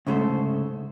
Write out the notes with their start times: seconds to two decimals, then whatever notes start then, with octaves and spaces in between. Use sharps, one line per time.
0.07 C2 G#2 C#3 A3 A4 C5